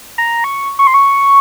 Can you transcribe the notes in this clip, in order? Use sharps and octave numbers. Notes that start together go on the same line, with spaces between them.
A#5
C#6
C#6
C6
C#6